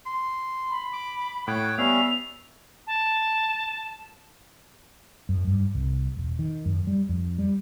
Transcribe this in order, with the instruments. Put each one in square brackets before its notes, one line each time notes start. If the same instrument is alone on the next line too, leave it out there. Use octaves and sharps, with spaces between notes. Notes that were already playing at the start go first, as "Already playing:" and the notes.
[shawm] C6
[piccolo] B5
[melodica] D6
[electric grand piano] A2 [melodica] C#5 G5 D6 [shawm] F#5
[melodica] G3 C#4 F5 [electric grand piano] B3 [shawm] E5 [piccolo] F7
[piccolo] A5
[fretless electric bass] F#2
G2
C2
E1
D#3
F#2
G3
F2
G3